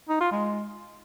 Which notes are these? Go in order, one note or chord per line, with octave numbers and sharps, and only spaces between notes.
D#4
F4
G#3